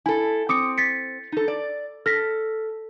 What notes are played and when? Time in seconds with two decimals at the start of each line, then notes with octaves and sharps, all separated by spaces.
0.06 E4 A4 G#5
0.49 C4 D6 D#6 C#7
0.78 A6 B6 C#7
1.32 D#4 A4
1.48 D5
2.06 A4 F6 A#6 B6